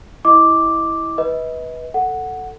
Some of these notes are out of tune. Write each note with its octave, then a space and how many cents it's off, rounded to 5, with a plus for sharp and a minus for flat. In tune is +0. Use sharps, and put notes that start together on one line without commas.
E4 -15 D#5 +15 D6 +0
B4 -10 D#5 +40
A4 +10 F#5 +0